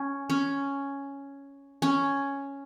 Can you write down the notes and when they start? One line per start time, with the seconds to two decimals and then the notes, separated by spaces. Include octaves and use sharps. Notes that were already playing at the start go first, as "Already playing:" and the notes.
Already playing: C#4
0.30 C#4
1.82 C#4